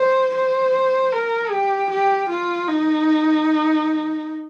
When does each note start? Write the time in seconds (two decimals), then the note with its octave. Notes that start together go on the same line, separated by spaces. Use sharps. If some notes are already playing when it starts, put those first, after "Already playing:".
Already playing: C5
0.34 C5
1.12 A#4
1.51 G4
1.90 G4
2.29 F4
2.68 D#4